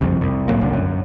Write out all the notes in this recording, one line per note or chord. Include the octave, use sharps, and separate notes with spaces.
F#1 C2 F2
C2
A2 F#3 A#3
F1 C2 D3
F#2